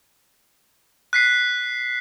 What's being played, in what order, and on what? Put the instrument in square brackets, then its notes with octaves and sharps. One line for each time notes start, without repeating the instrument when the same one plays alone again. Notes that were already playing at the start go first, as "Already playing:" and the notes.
[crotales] F#6 B6 C7